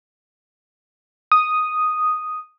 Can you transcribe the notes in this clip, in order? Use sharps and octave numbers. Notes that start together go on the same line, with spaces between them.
D#6